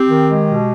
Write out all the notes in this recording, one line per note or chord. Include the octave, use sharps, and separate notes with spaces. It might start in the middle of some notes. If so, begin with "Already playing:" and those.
Already playing: C4 G4
D#3
G#3
B2